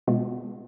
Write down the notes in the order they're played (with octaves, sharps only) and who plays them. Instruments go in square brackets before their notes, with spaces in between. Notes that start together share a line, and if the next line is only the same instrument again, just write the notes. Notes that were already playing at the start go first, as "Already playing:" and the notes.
[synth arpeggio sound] B2 G#3 B3 F4